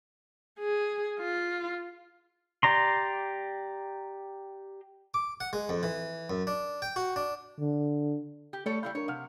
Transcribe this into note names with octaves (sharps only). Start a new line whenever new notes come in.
G#4
F4
G4 D5 A#5 C6
D6
F#5
G#3
F2
E3
F#2
D4
G5
F#4
D4
D3
G4
G3 A3 A4 C#5
G3 E4 F5 G6
D4 A#4 C#5
C3 F5 F#5 F6